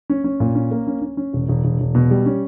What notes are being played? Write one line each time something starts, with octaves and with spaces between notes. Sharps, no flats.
C#4
C#4
A#2
C#4
A#3
C#4
C#4
C#4
E1
E1
E1
E1
B2
G3
C#4